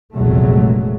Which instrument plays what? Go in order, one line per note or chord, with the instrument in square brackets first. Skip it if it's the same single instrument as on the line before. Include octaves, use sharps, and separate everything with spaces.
[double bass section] F1 A#1 E2 F#3 G#3 A3